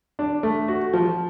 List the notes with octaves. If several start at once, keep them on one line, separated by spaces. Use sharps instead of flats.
D4
A3
F#4
F3